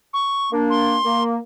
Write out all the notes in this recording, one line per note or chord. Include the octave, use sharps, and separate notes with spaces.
C#6
A#3 D4
C6
A#3